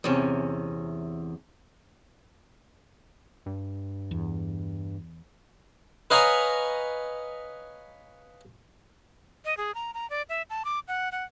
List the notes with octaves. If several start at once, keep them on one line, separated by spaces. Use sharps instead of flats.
E2 C3 C#4
G2
E2
B4 C#5 D#5 F5 G#5 A#5
D#5
G#4
A#5
A#5
D5
E5
A5
D6
F#5
F#5